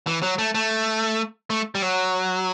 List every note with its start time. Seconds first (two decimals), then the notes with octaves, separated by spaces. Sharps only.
0.07 E3
0.23 F#3
0.38 A3
0.55 A3
1.50 A3
1.75 G3
1.82 F#3